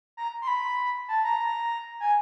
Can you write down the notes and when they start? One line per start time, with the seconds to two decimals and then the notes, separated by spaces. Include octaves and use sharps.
0.17 A#5
0.42 C6
0.47 B5
1.08 A5
1.24 A#5
2.00 G#5